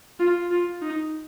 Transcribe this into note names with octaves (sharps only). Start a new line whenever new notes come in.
F4
F4
D#4